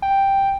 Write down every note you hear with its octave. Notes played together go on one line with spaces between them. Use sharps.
G5